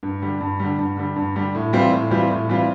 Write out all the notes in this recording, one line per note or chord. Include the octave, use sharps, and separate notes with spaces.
G2
D3 G3
G2
D3 G3
G2
D3 G3
G2
D3 G3
A2
E3 G3 C4 F4
A2
E3 G3 C4 F4
A2
E3 G3 C4 F4